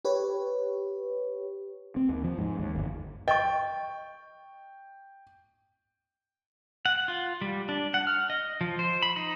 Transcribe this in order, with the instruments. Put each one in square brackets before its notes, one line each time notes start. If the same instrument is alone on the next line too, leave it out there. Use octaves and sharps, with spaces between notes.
[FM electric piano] G4 B4 C#5
[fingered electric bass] C4
D#2
F3
G#2
D#2
G1
[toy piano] D#5 C#6 [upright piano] G5
[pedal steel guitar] F#5
F4
G3
D4
F#5
F6
D#5
F3
C5
B5
D#4